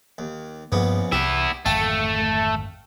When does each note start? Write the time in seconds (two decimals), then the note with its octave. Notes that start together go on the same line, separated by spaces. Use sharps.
0.18 D#2
0.72 A#1 G2 C#3 A#3 B3
1.12 C2 B3 E4 G4
1.66 G#1 F2 D3 A3 F5 G5